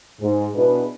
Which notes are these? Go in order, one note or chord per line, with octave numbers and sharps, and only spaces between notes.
G#2
B2 B3 D4 E4 G#4 B4